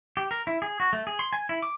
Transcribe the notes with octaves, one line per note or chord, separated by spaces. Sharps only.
G4
A#4
E4
G#4
F#4
A3
G#4
C6
G#5
E4
D6